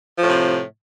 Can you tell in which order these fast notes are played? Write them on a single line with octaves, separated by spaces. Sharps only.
F3 A2 C3